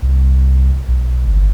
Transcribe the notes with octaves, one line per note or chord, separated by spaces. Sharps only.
C2
B1
G1